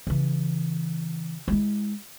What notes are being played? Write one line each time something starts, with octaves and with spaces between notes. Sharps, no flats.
C#3 E3
G#3 E4